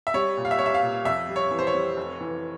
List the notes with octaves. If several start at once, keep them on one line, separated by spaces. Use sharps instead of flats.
E5
G3 C#5
A#2
F5
E5
G3 C#5
E5
F5
A#2
F2 E5
G3
C#5
E3
C5
C#5
G3
F1
E3